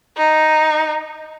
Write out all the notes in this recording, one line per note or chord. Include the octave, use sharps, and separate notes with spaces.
D#4